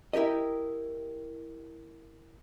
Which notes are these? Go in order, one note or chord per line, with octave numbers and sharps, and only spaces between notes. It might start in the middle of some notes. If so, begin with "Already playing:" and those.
E4 G4 A#4 D#5